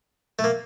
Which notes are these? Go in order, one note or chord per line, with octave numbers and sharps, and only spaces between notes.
A3
A#3